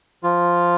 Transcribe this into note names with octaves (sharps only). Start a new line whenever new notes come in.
F3 F4